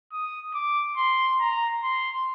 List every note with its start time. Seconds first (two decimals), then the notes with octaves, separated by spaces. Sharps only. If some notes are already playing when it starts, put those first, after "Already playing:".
0.12 D#6
0.54 D6
0.97 C6
1.40 A#5
1.83 C6